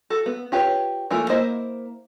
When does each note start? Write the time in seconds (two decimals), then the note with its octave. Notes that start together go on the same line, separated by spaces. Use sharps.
0.10 F#4 A4
0.26 B3
0.52 F4 G4 B4 C#5
1.11 E3 A3 A#3 F4
1.30 A#3 E4 C5 D#5